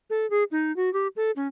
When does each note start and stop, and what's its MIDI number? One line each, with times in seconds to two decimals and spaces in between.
0.10 0.28 69
0.30 0.44 68
0.51 0.74 63
0.76 0.92 66
0.93 1.08 67
1.16 1.31 69
1.36 1.48 61